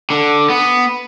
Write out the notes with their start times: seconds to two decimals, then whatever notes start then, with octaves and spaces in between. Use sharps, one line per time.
0.10 D3
0.50 B3